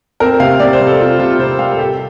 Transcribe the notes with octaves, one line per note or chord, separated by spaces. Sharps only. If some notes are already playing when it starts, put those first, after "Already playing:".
C4 A#4
C3 F5
C3 D5
C5
G3
A4
C4 F4
C3 F4
C3 C5
G3 F5
A4
C4 G4